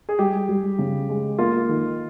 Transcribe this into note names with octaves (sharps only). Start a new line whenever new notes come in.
G#4
G3 G4
G3
C#3
G#3
A#3 F4
D#3